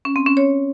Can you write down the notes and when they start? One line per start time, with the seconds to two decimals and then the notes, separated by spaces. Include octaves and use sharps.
0.05 C#4
0.16 C4
0.26 C#4
0.37 C#5